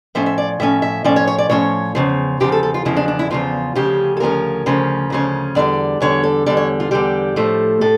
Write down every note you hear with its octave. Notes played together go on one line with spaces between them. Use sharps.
A2 F3 C#4 E5
E5
D5
A2 F3 C#4 E5
E5
A2 F3 C#4 D5
C#5
C#5
D5
A2 F3 C#4 C#5
E2 C#3 F3
E2 C#3 F3 G4
A4
A4
F4
E2 C#3 F3 E4
D4
D4
E4
E2 C#3 F3 F4
D2 C#3 F3 C#4 G4
A4
D2 C#3 F3 C#4 A#4
D2 C#3 F3 C#4
D2 C#3 F3 C#4
E2 D3 G3 D5
E2 D3 G3 C#5
A4
E2 D3 G3 D5
C#5
F4
E2 D3 G3 G4
A2 F3 A3
A2 A4